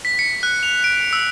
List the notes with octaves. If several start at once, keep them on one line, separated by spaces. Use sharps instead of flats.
B6
C#7
F#6
F7
D7
E6